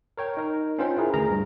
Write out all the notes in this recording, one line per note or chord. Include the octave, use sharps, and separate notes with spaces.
A#4 C#5 G5
D#4 A#4
C#4 D4 F4 B4 C5 G5
E4 G#4 A#4
D2 G#4 A#4 A#5
G2